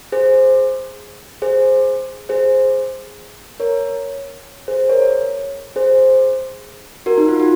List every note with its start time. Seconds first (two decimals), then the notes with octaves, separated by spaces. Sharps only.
0.12 G#4 C5
1.42 G#4 C5
2.29 G#4 C5
3.60 A#4 C#5
4.68 G#4 C5
4.89 A#4 C#5
5.76 G#4 C5
7.06 F#4 A#4
7.18 D#4
7.29 F4
7.40 F#4